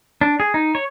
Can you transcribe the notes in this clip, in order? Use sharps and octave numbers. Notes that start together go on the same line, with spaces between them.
D4
G#4
D#4
C#5